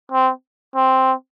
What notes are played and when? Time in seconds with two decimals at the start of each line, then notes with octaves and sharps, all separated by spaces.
0.12 C4
0.75 C4